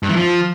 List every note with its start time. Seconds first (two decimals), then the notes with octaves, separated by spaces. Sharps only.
0.03 G2
0.09 E3
0.16 F3